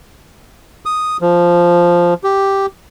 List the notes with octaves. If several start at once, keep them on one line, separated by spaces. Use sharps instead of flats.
D#6
F3
G4